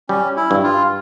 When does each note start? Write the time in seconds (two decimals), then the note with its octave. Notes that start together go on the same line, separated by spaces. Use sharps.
0.09 G3 C#4
0.37 E4
0.51 G2
0.63 F4